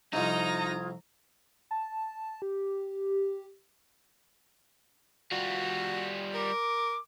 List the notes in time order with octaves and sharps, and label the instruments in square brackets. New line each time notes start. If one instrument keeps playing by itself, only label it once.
[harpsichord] C2 F2 [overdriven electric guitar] D#4 [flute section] F4 D#6 G#6 [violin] A#5
[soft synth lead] A5
G4
[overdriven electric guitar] G3 F4 [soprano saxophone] F#4
[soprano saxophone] A#4 [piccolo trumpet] D6